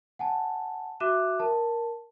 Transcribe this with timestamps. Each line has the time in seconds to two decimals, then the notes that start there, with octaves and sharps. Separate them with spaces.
0.19 F#5 G#5 A5
1.00 F#4 E5 D6 F#6 D#7 E7
1.40 A#4 A5